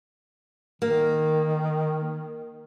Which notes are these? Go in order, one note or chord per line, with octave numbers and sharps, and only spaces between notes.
D#3 A#3